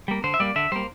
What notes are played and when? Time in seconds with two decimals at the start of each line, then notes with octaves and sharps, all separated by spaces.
0.08 G3 A#3
0.24 D3 C5
0.34 E5
0.40 G3 A#3 D5
0.56 D3 E5
0.72 G3 A#3 C5